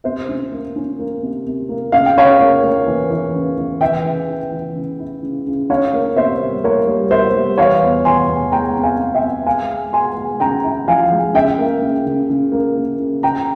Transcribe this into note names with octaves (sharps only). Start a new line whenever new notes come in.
C3 C5 E5
C#4
A#3
C#4
A#3
C3
C3
A#3
C#3 F5
G5
C#3 C#5 F5
A#3
A#3
E3
E3
C#3
E3
E3 E5 G5
C#3
E4
E3
C#3
E4
C#3
C#3
C#4 C#5 F5
A#3
C3 C5 E5
G3
A#3 A#4 C#5
G3
A#3 C5 E5
G3
E3 C#5 F5
E2
E3 G#5 C6
E2
G#3 G5 A#5
C4
F5 G#5
C4
E5 G5
C4
G#3 F5 G#5
G#3
G#3 G#5 C6
G#3
C#3 G5 A#5
E4
F3 F5 G#5
G#3
C#3 E5 G5
A#3
C#3
C#3
C#3
A#3
C#3
C#3
C#3 G5 A#5